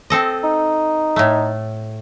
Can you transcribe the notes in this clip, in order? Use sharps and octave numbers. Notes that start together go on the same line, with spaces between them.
C4 A4 D#5
D#4
A2 A3